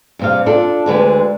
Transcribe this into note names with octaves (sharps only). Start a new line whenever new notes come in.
G2 C3 F5
D4 F4 A4
D2 D3 G#3 B4